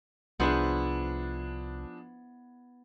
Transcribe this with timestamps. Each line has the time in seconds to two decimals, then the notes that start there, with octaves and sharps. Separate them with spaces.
0.40 C2 F3 B3 D4 E4 G#4 C5